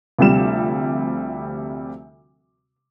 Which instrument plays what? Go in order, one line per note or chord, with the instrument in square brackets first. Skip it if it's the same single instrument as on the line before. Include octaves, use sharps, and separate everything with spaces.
[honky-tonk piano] D2 C3 F3 G3 E7